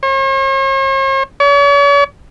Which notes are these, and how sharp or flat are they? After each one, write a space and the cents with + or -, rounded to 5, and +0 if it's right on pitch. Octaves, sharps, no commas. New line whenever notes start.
C#5 -45
C#5 +45